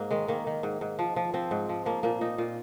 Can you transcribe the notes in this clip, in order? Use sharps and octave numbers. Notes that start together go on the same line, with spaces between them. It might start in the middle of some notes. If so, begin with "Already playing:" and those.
Already playing: G#2 A#3
D#3 G#3
D#3 A#3
D#3
G#2
G#2
F3
F3
F3 C4
G#2
F3
F3 A#3
A#2 A#3
A#2 D#4
A#2 F4